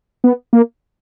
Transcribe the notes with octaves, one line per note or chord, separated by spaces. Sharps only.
B3
A#3